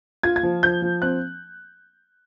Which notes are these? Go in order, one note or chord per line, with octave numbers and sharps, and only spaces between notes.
F4 G#6
G#6
F3
F3 G6
F3
C4 F#6